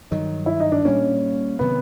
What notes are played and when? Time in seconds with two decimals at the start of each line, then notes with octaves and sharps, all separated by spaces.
0.11 G2 D#3 F#3 D#4
0.46 E4
0.60 D#4
0.72 D4
0.85 A#2 G3 A#3 C#4
1.59 C3 D#3 F#3 B3